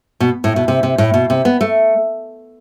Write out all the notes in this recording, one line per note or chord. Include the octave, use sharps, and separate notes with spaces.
B2
A2
B2
C3
C3
A2
B2
C3
B3
A3